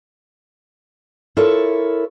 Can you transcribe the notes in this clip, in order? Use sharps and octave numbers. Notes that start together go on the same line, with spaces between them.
E4 F4 A4 A#4 C#5